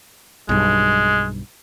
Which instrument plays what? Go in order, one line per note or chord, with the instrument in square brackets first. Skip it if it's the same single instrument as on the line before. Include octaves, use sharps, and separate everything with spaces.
[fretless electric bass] B1 G2 [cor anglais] G#3